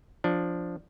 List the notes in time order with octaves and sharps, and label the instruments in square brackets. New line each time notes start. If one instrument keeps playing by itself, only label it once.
[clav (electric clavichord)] F3 D4